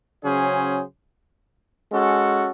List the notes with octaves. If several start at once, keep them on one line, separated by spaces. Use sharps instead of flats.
C#3 F#3 C#4 G#4 C5
G#3 C#4 F#4 A4